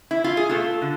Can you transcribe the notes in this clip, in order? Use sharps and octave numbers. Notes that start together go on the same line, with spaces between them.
E4
F4
G#4
B2 A3 F4 A4
D3